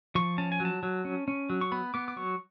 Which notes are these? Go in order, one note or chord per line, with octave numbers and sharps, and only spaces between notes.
F3 C#6
C#4 A5
G#5
F#3
A5
F#3
C#4
C#4
F#3
C#6
B3 B5
B3 D6
D6
F#3 C#6